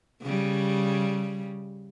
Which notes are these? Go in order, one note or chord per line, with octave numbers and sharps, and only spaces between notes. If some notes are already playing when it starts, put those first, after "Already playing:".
C#3 G3